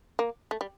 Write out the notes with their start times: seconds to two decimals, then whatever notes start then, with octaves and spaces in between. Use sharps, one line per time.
0.19 A#3
0.51 A3
0.61 G3